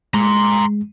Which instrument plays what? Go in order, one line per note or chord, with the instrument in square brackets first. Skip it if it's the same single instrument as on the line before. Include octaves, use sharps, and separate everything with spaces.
[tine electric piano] G#3 [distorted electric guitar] A#5 C6